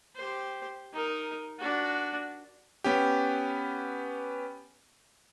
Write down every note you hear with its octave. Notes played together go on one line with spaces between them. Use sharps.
G4 C5
D#4 A#4
D4 F#4
B3 C#4 G4